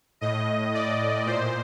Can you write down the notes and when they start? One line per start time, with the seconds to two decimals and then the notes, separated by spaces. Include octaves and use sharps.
0.21 A2 D#5
0.74 D5
1.26 A#2 C5